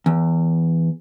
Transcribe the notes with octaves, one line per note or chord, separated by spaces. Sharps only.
E2